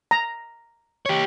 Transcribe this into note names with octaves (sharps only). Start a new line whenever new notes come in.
A#5
G4 C#5